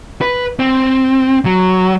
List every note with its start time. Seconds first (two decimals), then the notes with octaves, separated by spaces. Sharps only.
0.21 B4
0.59 C4
1.45 F#3